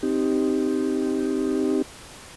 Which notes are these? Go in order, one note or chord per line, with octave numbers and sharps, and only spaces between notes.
C4 D#4 G4